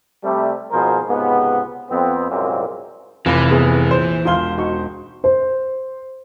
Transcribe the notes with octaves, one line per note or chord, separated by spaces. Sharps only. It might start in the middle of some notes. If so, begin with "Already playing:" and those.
C3 G3 A3
G#1 B2 F3 G#4 A#4 C5
C#2 G#2 C3 B3
F2 B3 C4
C2 F#2 A#2 G#3 A#3 C4
F1 E3 F4 B5 D6 A#6
B3 G#4
A#1 C5
E1 F4 F5 C6 G7
D#4 F#4 C#6
C5